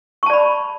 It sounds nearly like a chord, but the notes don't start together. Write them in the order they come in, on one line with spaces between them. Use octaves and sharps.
C#6 A5 D5 B5